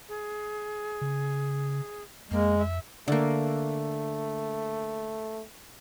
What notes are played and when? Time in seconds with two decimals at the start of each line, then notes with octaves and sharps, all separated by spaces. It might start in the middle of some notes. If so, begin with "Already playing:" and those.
0.09 G#4
1.01 C#3
2.31 F2 G#3 A#3
2.59 E5
3.08 D3 A3 A#3